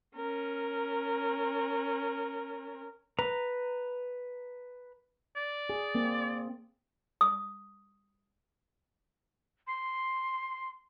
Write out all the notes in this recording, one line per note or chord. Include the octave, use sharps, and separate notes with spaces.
C#4 A#4
B4 A#5
D5
G#4
A#3 C4
D#6
C6